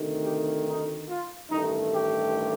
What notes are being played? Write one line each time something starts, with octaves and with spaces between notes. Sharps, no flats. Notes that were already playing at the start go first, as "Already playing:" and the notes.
Already playing: D2 C3 D#3 A3
G4
D#4
F4
A1 G2 D#3 A3 D#4
G4